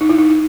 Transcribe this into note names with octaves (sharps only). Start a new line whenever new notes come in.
D#4
E4
D#4